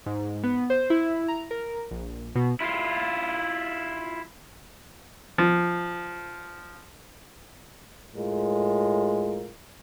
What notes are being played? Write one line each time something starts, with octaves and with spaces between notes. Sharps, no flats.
G#2
B3
C5
E4
A#5
A#4
A#1
B2
E4 F4
F3
A2 G#3 F4 A#4